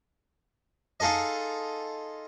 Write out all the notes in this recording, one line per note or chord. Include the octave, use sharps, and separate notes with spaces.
D#4 F4 G#4 A4 D#5